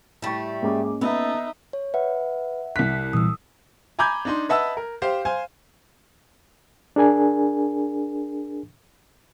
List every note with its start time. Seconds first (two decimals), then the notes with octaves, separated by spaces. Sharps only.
0.22 A2 G3 A3 C#6
0.63 G#2 A#3 C#4 G#4 D6
1.01 B3 D#4 A4 E5
1.73 C#5
1.94 B4 E5 F#5
2.76 C2 F#6 B6
3.13 A#2 E3 G3 D#6 E6
3.99 G#5 A#5 B5 D6 G6 G#6
4.25 D4 D#4 C6
4.49 B4 D#5 E5 F#5 A5 E6
4.77 A#4
5.02 G4 C5 F5
5.25 C5 F5 G#5
6.96 D4 G#4 A#4 G#5